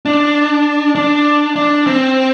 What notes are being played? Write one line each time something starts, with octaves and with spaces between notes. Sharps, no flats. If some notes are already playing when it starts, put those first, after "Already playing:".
D4
D4
D4
C4